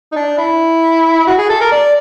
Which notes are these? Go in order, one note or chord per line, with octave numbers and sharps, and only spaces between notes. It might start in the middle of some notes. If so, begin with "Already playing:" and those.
D#4
D4
E4
F#4
G#4
A4
A#4
D5